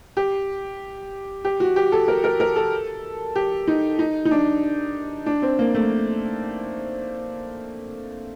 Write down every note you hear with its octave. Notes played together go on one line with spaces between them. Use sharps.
G4
G4
F#4
G4
A4
A#4
A#4
A#4
A4
G4
D#4
D#4
D#4
D4
D4
C4
A#3
A3